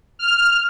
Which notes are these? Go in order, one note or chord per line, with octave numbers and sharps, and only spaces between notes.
F6